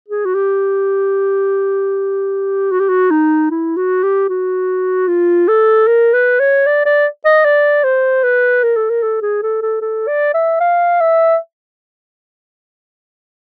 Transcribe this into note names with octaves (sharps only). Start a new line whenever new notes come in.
G#4
F#4
G4
F#4
G4
F#4
D#4
E4
F#4
G4
F#4
F4
A4
A#4
B4
C#5
D5
D5
D#5
D5
C5
B4
A#4
A4
A#4
A4
G#4
A4
A4
A4
D5
E5
F5
E5